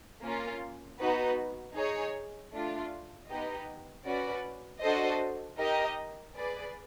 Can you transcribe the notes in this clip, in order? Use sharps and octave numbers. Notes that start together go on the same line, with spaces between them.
A#3 C#4 F4
B3 D#4 F#4 B4
D#4 G#4 C#5
A3 D4 F4
B3 D#4 G4 B4 D#5
C#4 F#4 B4 D5
D4 F#4 A4 C5 D#5
D#4 G4 A#4 D#5
G#4 B4 D5